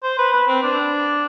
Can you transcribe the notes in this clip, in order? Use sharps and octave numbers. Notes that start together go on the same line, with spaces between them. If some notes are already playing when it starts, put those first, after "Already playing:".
C5
B4
B4
C4
D4